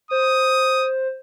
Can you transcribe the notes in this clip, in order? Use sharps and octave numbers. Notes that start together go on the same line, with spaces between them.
C5 D#6